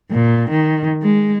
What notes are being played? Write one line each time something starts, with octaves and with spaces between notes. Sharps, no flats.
A#2
D#3
G#3